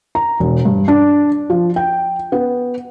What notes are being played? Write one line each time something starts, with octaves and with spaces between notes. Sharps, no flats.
A#5
E1
G2
D4
F3
G5
B3